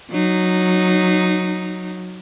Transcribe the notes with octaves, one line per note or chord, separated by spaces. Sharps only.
F#3 D#4